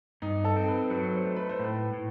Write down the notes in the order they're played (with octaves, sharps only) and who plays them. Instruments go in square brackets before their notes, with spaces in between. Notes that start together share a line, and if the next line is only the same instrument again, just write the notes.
[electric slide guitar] G2 [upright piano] D#4
[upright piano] A4
[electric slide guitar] C4
[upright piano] B4
[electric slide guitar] F#3 [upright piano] B4
[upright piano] C5
[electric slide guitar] A3
[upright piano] B4
C5
[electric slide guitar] A2 [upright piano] B4
[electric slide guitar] A2